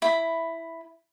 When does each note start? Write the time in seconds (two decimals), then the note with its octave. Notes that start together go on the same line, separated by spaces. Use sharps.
0.02 E4 B5